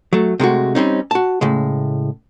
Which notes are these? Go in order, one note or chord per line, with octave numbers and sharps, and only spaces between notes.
F#3 A3
C3 G#3 A3 F#4
G3 C4 C#4 D#4
F#4 A5
A2 C#3 G#3